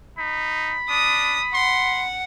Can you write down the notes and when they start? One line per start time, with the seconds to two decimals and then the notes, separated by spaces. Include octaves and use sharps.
0.18 D#4 B5
0.90 D4 D#6
1.54 F#5 C6